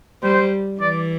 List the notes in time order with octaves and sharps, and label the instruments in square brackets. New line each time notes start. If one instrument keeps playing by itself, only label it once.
[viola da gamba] G3 [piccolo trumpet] C5
[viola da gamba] E3 [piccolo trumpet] D5